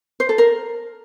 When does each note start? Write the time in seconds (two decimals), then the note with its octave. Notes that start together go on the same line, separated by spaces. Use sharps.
0.20 C5
0.29 A4
0.38 A#4